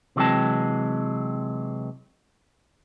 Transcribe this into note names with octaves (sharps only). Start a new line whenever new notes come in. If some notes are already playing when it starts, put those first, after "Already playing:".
C3 E3 F#3 G#3 C4 A5